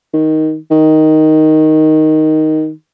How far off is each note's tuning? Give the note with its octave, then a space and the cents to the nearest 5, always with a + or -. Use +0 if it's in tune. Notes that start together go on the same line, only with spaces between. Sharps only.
D#3 +10
D#3 +5